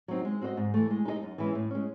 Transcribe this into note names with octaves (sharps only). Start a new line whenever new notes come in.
F#3 C4 D#4
G#3
C4 F#4 C5 D#5
G#2
E3 A3
G#3
D#4 G#4 D#5
F#2
E3 G#3 C#4 E4
A2
G#3 C#4